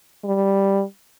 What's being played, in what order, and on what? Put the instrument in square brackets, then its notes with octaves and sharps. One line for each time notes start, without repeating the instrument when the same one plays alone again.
[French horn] G3